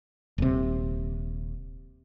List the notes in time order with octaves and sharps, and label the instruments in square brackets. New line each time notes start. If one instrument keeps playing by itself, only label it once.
[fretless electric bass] D#1 C3